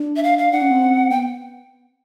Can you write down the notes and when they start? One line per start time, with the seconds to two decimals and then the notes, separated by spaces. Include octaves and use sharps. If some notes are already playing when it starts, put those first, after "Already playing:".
Already playing: D4
0.16 E5
0.23 F5
0.38 F5
0.52 D4 F#5
0.62 C#4
0.71 C4
1.10 B3 G5